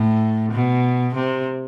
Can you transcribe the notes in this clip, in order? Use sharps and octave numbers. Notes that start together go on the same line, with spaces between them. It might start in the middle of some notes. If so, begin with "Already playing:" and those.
Already playing: A2
B2
C3